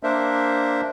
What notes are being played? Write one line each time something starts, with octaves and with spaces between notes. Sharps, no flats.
A#3 D4 A#4 C5 E5